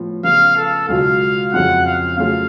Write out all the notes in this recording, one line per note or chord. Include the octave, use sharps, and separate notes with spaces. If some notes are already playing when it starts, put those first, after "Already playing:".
Already playing: A2 F3 B3 F4
C#3 F3 B3 F5
A4
C#2 B2 F#3 C#4 F4 F5
F2 C#3 F#3 C#4 F4 F#5
F5
C#3 F#3 A3 C#4 F4 F5